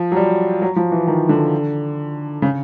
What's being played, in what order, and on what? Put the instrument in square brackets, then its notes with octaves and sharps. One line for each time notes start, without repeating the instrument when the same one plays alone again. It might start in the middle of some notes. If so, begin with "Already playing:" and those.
Already playing: [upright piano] F3
F#3
G3
F#3
F3
E3
D#3
D3
C#3